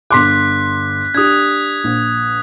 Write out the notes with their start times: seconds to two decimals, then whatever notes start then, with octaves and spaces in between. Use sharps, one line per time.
0.11 G1 C6 D6 F#6 B6
1.14 D4 G4 D#6 F#6 G#6
1.84 A#1